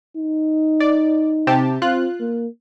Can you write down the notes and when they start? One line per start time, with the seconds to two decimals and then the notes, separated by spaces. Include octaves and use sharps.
0.17 D#4
0.80 D5
1.47 C3 G4 A5
1.82 C4 F4 F#6
2.20 A#3